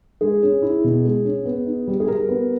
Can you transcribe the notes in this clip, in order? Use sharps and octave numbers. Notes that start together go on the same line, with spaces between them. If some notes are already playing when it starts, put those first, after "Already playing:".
G#3 G#4
C#4
E4
B2
G#3
C#4
B3
D#4
G3
G#4
G3 A#4
B3